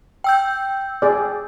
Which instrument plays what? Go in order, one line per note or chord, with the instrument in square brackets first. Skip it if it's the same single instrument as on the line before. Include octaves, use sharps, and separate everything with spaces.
[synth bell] G5 E6 G6
[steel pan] G#4 D5